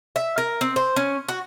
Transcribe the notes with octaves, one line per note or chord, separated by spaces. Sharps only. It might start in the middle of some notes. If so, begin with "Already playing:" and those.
E5
A#4
C4
C5
C#4
F#4